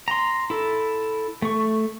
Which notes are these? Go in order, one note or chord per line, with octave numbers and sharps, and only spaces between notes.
A#5 C6
E4 A4
A3 C#6